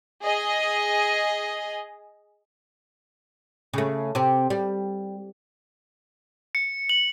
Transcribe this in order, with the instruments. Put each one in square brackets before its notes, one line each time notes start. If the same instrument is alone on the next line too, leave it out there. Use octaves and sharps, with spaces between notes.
[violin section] G#4 D#5
[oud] C#3 A3
C3 C4
G3
[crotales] C#7
F#7